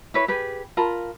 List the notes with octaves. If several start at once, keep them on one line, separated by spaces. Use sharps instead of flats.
E4 B4 C#5
G4 G#4 B4
F4 A#4 A5 B5